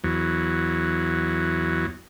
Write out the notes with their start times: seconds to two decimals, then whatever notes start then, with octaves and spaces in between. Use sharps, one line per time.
0.04 E2 F#3